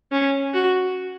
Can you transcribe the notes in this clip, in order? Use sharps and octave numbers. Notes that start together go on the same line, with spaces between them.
C#4
F#4